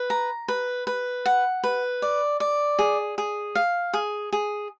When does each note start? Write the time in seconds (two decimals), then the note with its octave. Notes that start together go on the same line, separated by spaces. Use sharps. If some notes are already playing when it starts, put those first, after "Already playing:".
Already playing: B4
0.10 A#5
0.48 B4
0.87 B4
1.26 F#5
1.64 B4
2.02 D5
2.40 D5
2.79 G#4
3.18 G#4
3.55 F5
3.93 G#4
4.33 G#4